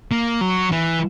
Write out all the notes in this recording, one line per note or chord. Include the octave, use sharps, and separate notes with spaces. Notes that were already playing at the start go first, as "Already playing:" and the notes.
A#3
F#3
E3